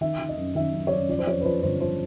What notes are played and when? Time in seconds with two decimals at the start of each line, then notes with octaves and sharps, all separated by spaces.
0.01 D#3 E5
0.19 D#3
0.29 D#5
0.37 F#2
0.55 D#3 E5
0.73 F#2
0.87 C#5
0.91 F#2 D5
1.09 F3 D5
1.19 C5
1.27 F2 C#5
1.41 B4
1.45 F3 C5
1.63 G1 C5
1.81 F3 C5